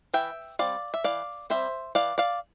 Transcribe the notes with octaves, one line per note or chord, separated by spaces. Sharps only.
E3 E5 G5
G3 C4 D5 F5
E5
E3 D5 F5
G3 C4 C5 E5
E3 D5 F5
D5 F5